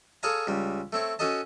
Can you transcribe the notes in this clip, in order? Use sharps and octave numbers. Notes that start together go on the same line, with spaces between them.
G#4 A4 C#5 F5 G#5 A#5
C#2 G3
A3 C4 C#5
C#4 F#4 A4 D#5 A5